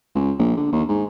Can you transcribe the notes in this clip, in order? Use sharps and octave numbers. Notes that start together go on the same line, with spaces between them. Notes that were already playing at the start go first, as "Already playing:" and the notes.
C#2
A#1
D3
D#2
G#2